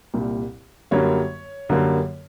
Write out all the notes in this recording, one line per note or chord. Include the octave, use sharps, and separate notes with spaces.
C2 A#2 G3
F#2 D3 G3 A#3 C#5
F#2 D3 G3 A#3